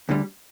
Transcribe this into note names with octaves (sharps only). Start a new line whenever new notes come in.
D2 D3 G3